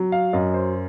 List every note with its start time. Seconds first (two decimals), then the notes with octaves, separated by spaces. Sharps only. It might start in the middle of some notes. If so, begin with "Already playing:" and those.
Already playing: F#3
0.12 F5
0.33 F#2 D#5
0.54 C5